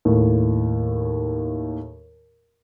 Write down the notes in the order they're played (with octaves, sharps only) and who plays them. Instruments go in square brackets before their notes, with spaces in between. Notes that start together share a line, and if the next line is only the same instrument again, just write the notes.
[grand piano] D#2 A2